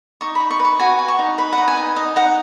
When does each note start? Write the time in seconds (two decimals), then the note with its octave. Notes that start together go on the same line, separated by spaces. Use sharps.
0.21 D#4 C#6
0.35 D#4 B5
0.51 C#6
0.60 B4
0.65 C#6
0.79 F#4 G#5
0.99 F#4
1.08 C#6
1.19 D#4
1.38 B4 B5
1.53 F#5
1.58 D#4
1.68 G#5
1.77 D#4
1.96 D#4 D#5
2.16 D#4 F#5